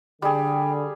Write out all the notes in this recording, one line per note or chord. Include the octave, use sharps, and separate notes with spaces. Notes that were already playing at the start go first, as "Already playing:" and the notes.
D3 G3 G#4 G5